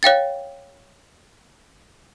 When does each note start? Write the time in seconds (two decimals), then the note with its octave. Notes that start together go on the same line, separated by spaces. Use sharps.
0.03 C#5 F5 G5 A6